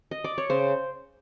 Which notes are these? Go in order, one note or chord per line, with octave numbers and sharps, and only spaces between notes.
D#5
D5
C#5
C#3 C5